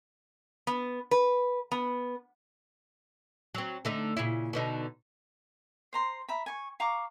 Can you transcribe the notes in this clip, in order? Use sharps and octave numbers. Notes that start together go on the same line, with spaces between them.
B3
B4
B3
F#3 C4
D3 A3 D#4
A#2 C#3 E4
B2 D3 D#4
C5 A#5 C6
E5 A#5 B5
G#5 C#6
F5 A#5 C#6 D6